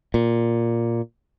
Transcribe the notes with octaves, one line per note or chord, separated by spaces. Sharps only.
A#2